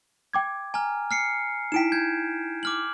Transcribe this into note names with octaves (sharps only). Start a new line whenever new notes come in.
G5 D6 G#6
G#5 A#5 F6
F6 C7 C#7
D#4 E4 G5 B6 D7 E7
G6 G#6
D6 F6 F#7